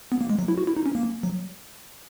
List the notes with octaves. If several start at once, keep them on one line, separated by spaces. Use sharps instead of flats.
B3
A#3
G#3
F#3
E4
F#4
E4
D#4
C#4
A#3
F#3